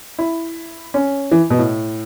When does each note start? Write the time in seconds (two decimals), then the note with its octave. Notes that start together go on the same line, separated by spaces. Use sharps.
0.19 E4
0.94 C#4
1.31 E3
1.50 B2
1.58 A2